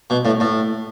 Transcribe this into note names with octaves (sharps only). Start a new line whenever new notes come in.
B2
A2
A2